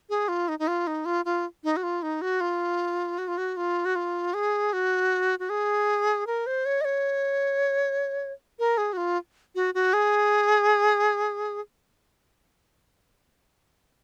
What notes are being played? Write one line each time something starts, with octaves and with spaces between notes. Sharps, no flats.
G#4
F4
D#4
D#4
F4
D#4
F4
F4
D#4
F#4
F4
D#4
F#4
F4
F#4
F4
F#4
F4
F#4
F4
G#4
F#4
F#4
G#4
A#4
C5
C#5
D#5
C#5
A#4
G#4
F#4
F4
F#4
F#4
G#4